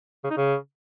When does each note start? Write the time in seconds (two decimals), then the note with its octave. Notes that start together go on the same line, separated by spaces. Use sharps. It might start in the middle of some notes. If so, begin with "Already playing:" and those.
0.24 C#3
0.31 D#4
0.37 C#3